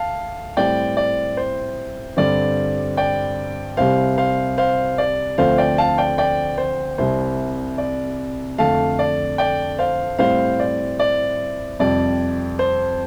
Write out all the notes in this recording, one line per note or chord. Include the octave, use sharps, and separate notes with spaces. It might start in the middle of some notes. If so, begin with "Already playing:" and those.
Already playing: D2 F5 A5
A2 G3 C4 D5 G5
D5
C5
G2 D3 G3 C4 D5
D5 G5
C2 C3 G3 C5 F5
C5 F5
C5 F5
D5
D2 D3 F3 A3 C4 C5 F5
D5 G5
F5 A5
D5 G5
D5 G5
C5
C2 C3 G3 C5
D5
F2 D3 A3 F5 A5
D5
D5 G5
C5 F5
A2 G3 C4 C5 F5
D5
D5
F2 C3 G3 D5
C5